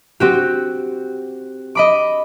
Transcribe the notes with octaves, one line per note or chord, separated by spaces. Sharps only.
C4 F#4 G4
D#5 B5 D6